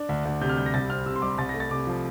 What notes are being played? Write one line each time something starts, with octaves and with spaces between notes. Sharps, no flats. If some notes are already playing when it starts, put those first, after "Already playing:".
Already playing: D4
D2
D2
C3 G6
F6
G3 G6
A#6
C2 A6
C4 F6
C3 E6
C6
G3 D6
C2 A6
A#6
A3
A6
C3 D6
F3